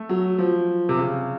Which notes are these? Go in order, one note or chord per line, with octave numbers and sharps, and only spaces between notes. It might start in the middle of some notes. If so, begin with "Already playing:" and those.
Already playing: A3
F#3
F3
C3
C#3